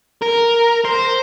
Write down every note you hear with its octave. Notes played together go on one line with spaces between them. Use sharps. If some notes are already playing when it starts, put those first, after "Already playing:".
A#4
C5